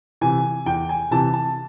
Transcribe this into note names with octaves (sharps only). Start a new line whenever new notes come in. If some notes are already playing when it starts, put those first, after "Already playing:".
C3 E3 G#5
E2 G5
G#5
C3 E3 A5
A5